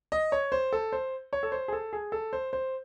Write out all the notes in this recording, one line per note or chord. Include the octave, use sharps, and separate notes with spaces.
D#5
C#5
C5
A4
C5
C#5
A4
C5
G#4
A4
G#4
A4
C5
C5